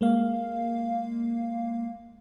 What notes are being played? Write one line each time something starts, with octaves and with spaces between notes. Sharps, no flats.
G#3 A#3 F5